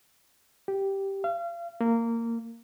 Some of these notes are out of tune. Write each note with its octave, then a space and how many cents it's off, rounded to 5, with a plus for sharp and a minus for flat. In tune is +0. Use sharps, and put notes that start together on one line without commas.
G4 -5
F5 -35
A#3 -15